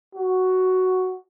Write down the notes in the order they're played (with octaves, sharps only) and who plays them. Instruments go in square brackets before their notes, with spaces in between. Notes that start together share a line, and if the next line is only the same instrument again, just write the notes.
[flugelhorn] F#4